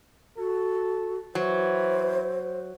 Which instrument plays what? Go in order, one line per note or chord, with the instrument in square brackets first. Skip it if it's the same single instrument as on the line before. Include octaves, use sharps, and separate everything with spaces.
[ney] F#4 [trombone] A4
[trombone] E3 [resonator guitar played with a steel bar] F#3 [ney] C5